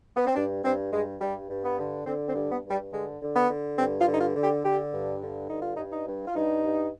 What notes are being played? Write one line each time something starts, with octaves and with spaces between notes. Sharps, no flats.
B3
C4
G2 D4
G2 C4
G2 G#3
G2 G3
G2
B3
D3
D3 C4
C4
G2
B3
G2
G3
D3 G#3
D3
B3
D3
G2 C4
F4
D3
D#4
F4
D3
G4
D3 G4
G2
D3
G2 D#4
F4
D#4
G2
D#4
G2
F4
G2 D#4
G2